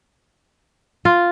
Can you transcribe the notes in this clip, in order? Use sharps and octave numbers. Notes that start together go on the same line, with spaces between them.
F4